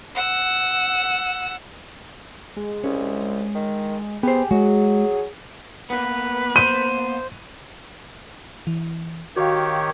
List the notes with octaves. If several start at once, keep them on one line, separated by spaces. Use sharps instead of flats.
F#5 E6
G#3
C2 C#4
D#3
B3 G4 G#4 C5
F#3 G#3 F#4
A#3 B3 B4
C5 D#7
E3
D#3 F#4 G4 C#5 F5